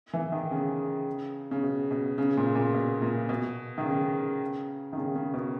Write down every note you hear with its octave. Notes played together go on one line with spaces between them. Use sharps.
E3
D#3
C#3
C#3
B2
B2
C#3
A#2
A#2
B2
A#2
B2
D#3
C#3
D#3
C#3
C#3
B2